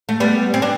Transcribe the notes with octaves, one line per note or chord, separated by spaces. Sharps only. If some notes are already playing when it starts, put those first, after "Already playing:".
A3
G3 B3
C4
D4